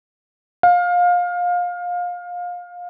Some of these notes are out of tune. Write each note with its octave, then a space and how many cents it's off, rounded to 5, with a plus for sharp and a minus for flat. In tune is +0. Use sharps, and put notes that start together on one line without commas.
F5 +25